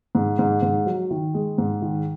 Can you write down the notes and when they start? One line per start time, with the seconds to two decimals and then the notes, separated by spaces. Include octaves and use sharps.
0.15 G#2
0.39 G#2
0.62 G#2
0.86 F#3
1.10 D#3
1.34 G#3
1.58 G#2
1.82 D#3